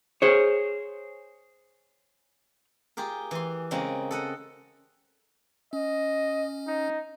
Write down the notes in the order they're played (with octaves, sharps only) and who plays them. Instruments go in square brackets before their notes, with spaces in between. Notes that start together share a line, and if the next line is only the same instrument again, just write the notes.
[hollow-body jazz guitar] G#4 C5 C#5
[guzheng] F4 G4 G#4 A#4
E3 C6
C#3 G#3 A#3 C4
A4 D#5 F#5
[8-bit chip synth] C#4 [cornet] D#5
[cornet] D#4